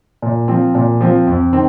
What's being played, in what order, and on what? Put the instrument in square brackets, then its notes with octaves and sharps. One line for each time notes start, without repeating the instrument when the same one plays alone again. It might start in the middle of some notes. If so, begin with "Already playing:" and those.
[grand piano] A#2
F3 C4
A#2
F3 C4
F2
D#3 C4